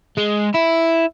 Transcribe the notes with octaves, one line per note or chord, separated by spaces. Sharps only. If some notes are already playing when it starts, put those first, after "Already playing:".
G#3
E4